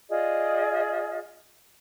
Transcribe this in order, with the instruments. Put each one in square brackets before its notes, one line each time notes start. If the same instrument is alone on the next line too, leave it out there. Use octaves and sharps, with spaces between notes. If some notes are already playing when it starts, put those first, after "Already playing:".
[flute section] F4 G#4 D5 D#5